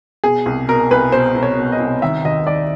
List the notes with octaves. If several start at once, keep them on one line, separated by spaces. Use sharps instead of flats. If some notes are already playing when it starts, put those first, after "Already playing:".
B2 G#4
C2
B2 A#4
C2 B4
B2 C5
C2
C#5
B2
D#5
C2
D#3 E5
D#2 D#5
D#3 D5